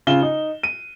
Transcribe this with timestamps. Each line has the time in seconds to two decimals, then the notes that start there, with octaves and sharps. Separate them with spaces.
0.07 C#3 F4 E7 G7
0.22 D#4
0.63 D#7